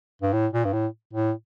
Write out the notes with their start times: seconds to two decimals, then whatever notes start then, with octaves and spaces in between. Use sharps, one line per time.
0.22 G2
0.33 A2
0.53 A#2
0.65 G2
0.73 A2
1.13 A2